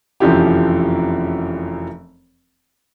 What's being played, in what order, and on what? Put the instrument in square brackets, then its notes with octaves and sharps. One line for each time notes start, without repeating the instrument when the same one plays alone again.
[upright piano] F1 F#2 E3 F3 C4 G4